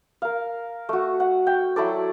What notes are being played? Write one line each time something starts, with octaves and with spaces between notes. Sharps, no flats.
A#4 F5
A3 F#4
F#5
G5
F#3 E4 A4 D5